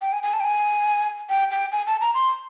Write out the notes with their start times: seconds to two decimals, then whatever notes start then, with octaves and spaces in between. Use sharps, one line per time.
0.02 G5
0.12 G#5
0.23 G#5
0.33 A5
0.40 G5
0.44 G#5
1.30 G5
1.51 G5
1.72 G#5
1.87 A5
2.01 A#5
2.15 C6